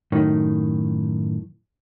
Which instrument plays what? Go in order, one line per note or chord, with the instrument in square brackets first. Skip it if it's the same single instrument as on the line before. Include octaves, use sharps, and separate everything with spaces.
[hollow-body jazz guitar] F#2 A2 D#3